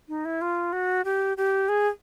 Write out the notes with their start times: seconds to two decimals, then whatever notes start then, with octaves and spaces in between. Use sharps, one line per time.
0.09 D#4
0.25 E4
0.41 F4
0.73 F#4
1.05 G4
1.37 G4
1.69 G#4